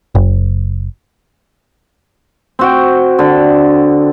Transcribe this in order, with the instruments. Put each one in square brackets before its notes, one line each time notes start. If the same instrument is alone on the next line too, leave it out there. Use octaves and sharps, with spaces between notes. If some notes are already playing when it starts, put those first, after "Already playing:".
[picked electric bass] F#1
[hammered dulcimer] C4 F#4 G5
D3